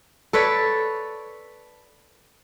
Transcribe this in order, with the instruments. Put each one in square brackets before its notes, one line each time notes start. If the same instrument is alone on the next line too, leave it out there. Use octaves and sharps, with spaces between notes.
[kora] A4 B4 C#5 D5